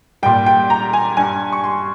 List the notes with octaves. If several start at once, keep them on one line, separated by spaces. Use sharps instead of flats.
A#2 G3 G5
G5
A#5
G#5
G2 G3 G#5
C#6
C6